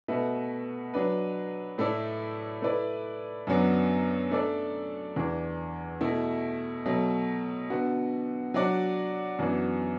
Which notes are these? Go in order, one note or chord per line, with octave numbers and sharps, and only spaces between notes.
B2 A3 F#4 B4 E5
F#3 D4 B4
A2 A3 E4 A4 D5
A3 E4 B4 D5
F#2 D3 F#3 B3 D4
A3 D4 A4 D5
E2 E3 D4
B2 A3 E4
B2 F#3 A3
D3 B3 F#4
F#3 D4 F#4 D5
F#2 E3 B3 D4 F#4